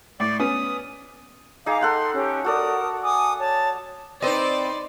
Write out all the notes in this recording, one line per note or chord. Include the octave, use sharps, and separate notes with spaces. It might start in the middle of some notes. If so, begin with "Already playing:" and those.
A2 D5
B3 C#4 D#6
D#4 G#4 F5 G#5 D6
A4 F#5 G5 C6
C#4 G4
F#4 A4 A#4 D5 D#6
G#5 D6 D#6
C#5 A5
C4 D#4 B4 C5 D5 D#5 C6